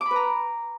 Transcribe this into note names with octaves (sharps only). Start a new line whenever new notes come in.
D6
B5
B4
A#5